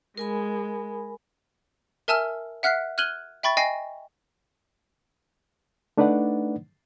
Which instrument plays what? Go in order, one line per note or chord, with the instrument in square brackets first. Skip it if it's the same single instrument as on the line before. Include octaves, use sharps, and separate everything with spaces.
[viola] G#3 [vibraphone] A#4 G#5 B5
[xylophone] A#4 E5 G#5 A5 E6 F6
E5 F#5 F6 F#6 B6 C7
F6 F#6 G#6 D#7 F#7 G7
E5 G5 B5 C#6 A6
D#5 G5 G#5 A#6 C7
[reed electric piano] A3 D4 D#4 B4 D5 F#5